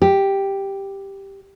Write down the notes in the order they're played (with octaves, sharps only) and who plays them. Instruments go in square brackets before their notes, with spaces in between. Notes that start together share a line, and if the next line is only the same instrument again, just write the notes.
[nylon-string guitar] G4